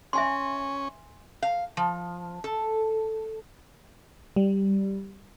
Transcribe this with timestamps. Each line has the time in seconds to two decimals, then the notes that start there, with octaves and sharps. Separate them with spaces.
0.13 C#4 E5 G#5 C6
1.42 F5
1.77 F3
2.44 A4
4.36 G3